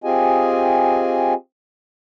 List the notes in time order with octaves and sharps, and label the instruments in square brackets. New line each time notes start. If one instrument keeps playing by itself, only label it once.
[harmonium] C4 F4 G4 G#4 D#5 G#5